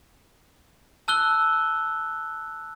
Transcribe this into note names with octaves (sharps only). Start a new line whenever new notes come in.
A5 E6 F#6 G7